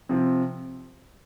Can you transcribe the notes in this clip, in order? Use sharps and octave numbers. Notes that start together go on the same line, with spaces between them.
C3 F3 C4